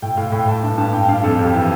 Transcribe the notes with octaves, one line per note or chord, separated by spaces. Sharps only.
A2 G5
A2 F5
A2 G5
A2 A5
G2 A5
G2 A5
G2 G5
G2 F5
F2 A4
F2
G4
E3